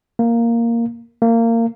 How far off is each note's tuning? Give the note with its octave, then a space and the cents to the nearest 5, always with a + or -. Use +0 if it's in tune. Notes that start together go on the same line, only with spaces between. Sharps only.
A#3 -5
A#3 -25